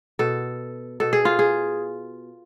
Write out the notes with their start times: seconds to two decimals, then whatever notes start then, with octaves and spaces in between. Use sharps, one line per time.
0.19 B2 A4
1.00 B2 A4
1.13 G#4
1.25 F4
1.39 G#4